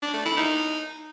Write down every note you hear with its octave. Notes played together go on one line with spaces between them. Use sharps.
D4
A3
E4
D#4